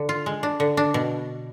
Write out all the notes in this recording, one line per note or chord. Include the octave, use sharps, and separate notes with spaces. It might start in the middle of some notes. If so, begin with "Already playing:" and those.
Already playing: D3 D4
F4
G#3
D4
D3
D4
B2